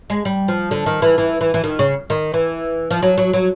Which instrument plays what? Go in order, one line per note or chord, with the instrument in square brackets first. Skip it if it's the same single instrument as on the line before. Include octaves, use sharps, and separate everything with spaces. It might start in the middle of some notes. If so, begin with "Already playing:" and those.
[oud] G#3
G3
F3
D3
D#3
E3
E3
E3
E3
D#3
C#3
D#3
E3
F3
F#3
F#3
F#3